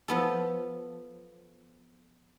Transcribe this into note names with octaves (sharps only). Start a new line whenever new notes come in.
F3 B3 A4